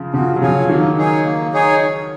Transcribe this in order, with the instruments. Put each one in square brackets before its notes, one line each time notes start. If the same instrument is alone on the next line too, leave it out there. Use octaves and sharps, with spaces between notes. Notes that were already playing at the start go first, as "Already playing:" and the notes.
Already playing: [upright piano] C#3 F3
[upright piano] C#3 F3 [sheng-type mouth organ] F#4
[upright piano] F#3
[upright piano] C#3 F3 [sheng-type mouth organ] C#5 F5 G#5
[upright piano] D#3 F#3 [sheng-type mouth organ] A#3
[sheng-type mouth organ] D#4 G#4 C#5 G#5
A#3
D#4 G#4 C#5 G#5